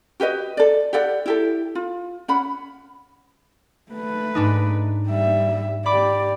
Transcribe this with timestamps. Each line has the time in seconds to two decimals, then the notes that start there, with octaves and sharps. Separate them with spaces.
0.20 F#4 G4 B4 D#5
0.57 A4 D5
0.93 G4 A4 D5 F#5
1.26 E4 G4 A4
1.75 F4
2.28 C#4 F#5 B5
3.92 A3 B4
4.35 G#2 D4 D#4
5.08 G3 E5
5.86 G4 D5 B5 D6